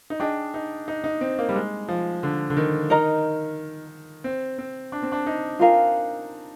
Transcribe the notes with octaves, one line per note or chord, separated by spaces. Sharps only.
D#4
D4 G#4 D#5 G5
D#4
D#4
D#4
C4
A#3
G3
G#3
F3
D3
D3
D#3
D#4 A#4 D#5 A#5
C4
C4
D4
C4
D4
D#4
F4 A#4 F5 G#5